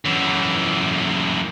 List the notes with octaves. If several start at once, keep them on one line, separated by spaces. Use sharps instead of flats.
F#2 E3